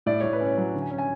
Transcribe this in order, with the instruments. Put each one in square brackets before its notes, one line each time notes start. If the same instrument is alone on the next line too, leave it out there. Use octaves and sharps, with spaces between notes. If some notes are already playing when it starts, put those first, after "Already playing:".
[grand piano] A2 D5
A2 C#5
B4
C#4
C#5
F#3
D3
G#5
C#4
G#5